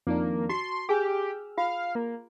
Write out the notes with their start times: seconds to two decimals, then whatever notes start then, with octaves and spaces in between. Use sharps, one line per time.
0.07 F2 D#3 A#3 D4
0.50 F#4 A5 C6 C#6
0.89 G4 G#4 G5 G#5 E6 F6
1.58 F4 F5
1.95 A#3